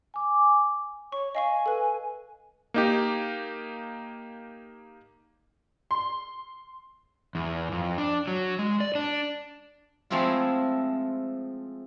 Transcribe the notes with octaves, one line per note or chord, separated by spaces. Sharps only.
G#5 D6
C#5 C#6
D#5 F5 G#5 C#6
A4 B4
A#3 D#4 G4
C6
E2
F2
D4
F#3
G#3
D5
D4
F3 G#3 A3 C4 E4 F4